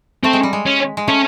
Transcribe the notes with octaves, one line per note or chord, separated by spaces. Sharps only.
A3 C4
G#3
G3
G#3
C#4
G#3
A3 C#4